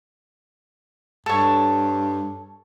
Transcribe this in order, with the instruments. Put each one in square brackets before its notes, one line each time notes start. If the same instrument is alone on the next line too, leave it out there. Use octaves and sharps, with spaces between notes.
[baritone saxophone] G2 [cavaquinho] A4 C#5